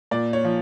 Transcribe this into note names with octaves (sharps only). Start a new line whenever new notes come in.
A#2 D5
C#5
F3